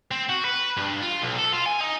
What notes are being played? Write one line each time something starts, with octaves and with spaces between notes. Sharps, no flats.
C4
F#4
B4
G2
F4
B1
A4
F4
G#5
D#4